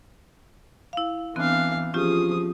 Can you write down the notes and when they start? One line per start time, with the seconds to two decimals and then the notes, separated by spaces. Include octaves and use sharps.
0.93 E4 F5
1.36 E3 B3 C4 D4 F5 F#6
1.94 F3 C#4 F4 G4 G#4 D#6